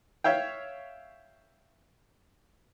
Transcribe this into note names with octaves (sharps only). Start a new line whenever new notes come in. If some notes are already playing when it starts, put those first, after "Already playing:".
C#5 E5 F5 G5